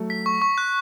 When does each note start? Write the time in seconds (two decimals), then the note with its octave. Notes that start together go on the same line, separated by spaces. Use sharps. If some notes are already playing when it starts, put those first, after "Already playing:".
Already playing: F#3 A3
0.10 B6
0.26 C#6
0.42 C#6
0.58 F#6